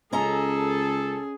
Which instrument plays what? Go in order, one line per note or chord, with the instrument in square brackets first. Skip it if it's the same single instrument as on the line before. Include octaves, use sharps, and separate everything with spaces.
[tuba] C#2 [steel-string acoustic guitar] C#4 D#5 A#5 [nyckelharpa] G#4 [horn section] A4